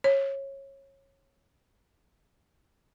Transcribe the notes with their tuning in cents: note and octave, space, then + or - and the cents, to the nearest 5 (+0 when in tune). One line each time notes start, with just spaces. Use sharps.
C#5 -20